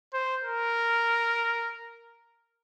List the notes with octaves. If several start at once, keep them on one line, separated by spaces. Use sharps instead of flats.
C5
A#4